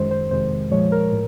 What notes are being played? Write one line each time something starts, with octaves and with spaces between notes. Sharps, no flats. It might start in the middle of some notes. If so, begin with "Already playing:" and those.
Already playing: F#2 D#3 G#3 C5
C5
F2 C3 D#3 G#3 C5
A#2 F3 G#3 C#5
A#4
A2